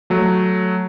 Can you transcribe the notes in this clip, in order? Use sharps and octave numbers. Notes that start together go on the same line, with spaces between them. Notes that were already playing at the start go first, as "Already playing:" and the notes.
F#3 A3